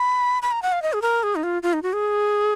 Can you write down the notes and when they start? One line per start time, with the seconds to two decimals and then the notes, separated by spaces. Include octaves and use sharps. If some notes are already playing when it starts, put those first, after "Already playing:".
Already playing: B5
0.42 B5
0.51 A#5
0.62 F#5
0.72 F5
0.82 D#5
0.93 G#4
1.02 A#4
1.23 G#4
1.35 D#4
1.43 F4
1.63 F4
1.73 D#4
1.82 F#4
1.93 G#4